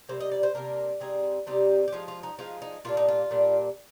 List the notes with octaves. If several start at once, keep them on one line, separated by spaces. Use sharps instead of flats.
C3 G3 A#3 C5
D#5
D5
C5
C3 G3 A#3 D4 A#4
C3 G3 C4 D#4 G#4
C3 G3 C4 D#4 G4
G4
F3 G#3 D#4 F4
F4
D#4
F3 G#3 D#4 F4
D#4
A#2 G3 D4 F4
D#4
F4
A#2 G3 D4